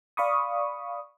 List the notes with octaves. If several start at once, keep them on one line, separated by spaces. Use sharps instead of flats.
D5 F5 B5 C#6 D#6